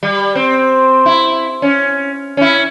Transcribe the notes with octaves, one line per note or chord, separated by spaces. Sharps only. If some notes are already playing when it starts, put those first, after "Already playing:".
G3
C4
E4
C#4
C#4 E4